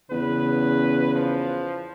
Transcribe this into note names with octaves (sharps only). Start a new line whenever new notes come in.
E2 C#3 B4
F3